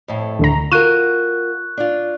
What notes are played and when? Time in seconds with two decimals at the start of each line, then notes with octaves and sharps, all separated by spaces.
0.08 F2 A2
0.39 D2 D3 A#5
0.72 F4 F#4 A#4 C#6 F#6 D#7
1.77 D4 F4